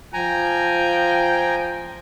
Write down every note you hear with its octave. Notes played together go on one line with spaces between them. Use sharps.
F3 G5 G#5 A#5